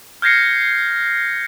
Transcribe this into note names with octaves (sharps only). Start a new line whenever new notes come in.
F6 G6 G#6 A#6 C7 C#7